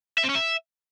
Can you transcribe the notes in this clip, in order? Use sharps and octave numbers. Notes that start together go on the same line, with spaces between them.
E5
C4
C#4
E5